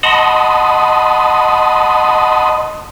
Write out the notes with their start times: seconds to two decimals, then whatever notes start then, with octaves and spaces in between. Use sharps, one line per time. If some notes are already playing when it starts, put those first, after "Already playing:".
0.03 D#5 F#5 A5 B5 C6 D#6